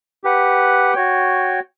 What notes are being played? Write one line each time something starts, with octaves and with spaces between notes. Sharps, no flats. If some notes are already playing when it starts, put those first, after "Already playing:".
G4 B4 F#5
F#4 C#5 G5